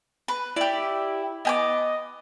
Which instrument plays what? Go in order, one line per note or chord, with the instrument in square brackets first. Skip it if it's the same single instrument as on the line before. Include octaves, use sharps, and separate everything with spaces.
[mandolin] B4
[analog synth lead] E4 [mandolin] G4 D5
[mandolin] B3 G#5 D6 [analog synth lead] D#5